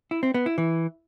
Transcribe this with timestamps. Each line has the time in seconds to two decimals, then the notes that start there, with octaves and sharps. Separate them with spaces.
0.11 E4
0.23 C4
0.34 B3
0.46 E4
0.58 E3